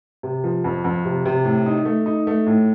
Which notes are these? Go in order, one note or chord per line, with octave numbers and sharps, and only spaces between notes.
C3
F3
F2
F2
C3
C3
A2
D#4
A3
D#4
A3
A2